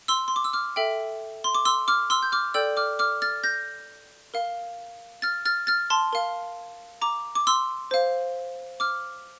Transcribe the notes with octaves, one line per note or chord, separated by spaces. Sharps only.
C6 E6
C6
D6
E6
D6 F6
A4 E5 G5
C6
D6
C6 E6
D6 F6
C6 E6
G6
D6 F6
A4 D5 G5 E6 G6
D6 F6
D6 F6
F6 A6
G6 A#6
A#4 F5
F6 A6
F6 A6
F6 A6
A5 C6
A#4 F5
A#5 D6
D6
C6 E6
C5 F5
D6 F6